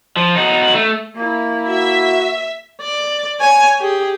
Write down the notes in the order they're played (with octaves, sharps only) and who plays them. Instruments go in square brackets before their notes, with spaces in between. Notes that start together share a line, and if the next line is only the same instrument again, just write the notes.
[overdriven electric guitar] F3
D#4 F#4
A3
[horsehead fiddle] A#3 E4
[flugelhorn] F#4 [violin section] E5
[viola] D5
C#5 G#5
G4 G#4